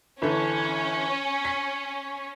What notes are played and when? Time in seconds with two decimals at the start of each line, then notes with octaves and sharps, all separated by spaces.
0.22 G1 E3 C#4 A4
1.45 B6